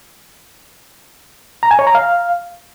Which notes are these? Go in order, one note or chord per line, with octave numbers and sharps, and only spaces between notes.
A#5
G#5
C#5
A#5
F5